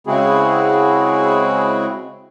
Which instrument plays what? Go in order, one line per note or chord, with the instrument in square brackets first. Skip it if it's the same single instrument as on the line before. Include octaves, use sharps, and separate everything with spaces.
[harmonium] C#3 G#3 C4 E4 F#4 G#4